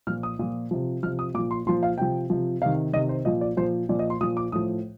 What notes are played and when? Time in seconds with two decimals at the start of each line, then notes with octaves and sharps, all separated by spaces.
0.07 A#2 F3 F6
0.23 D#6
0.39 A#2 F3
0.71 C3 F3
1.03 F3 F6
1.06 C3
1.19 D#6
1.34 A#2 D6
1.39 F3
1.51 C6
1.66 A#2 F3 C6
1.83 F5
1.98 C3 F3 G5
2.30 C3 F3
2.62 C3 D#3 F5
2.93 C3 D#3 D#5
3.09 C5
3.25 A#2 F3 D#5
3.41 D5
3.57 A#2 F3 C5
3.89 A#2 F3 D5
3.99 D#5
4.10 C6
4.21 A#2 F3 D#6
4.37 D6
4.52 A2 F3 D#6